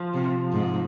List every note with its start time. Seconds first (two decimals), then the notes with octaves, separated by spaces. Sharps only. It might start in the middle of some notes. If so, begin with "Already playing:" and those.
Already playing: F3
0.14 C3
0.52 G#2